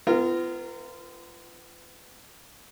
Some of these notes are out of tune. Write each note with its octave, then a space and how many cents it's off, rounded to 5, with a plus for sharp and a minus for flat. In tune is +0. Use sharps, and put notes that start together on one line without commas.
B3 +35 F4 -30 A#4 -10